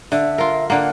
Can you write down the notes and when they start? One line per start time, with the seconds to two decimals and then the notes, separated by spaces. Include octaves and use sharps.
0.12 D3 E5
0.38 F4 A#4
0.70 D3 A#3 F#5